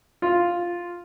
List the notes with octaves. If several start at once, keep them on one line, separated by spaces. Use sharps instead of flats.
F4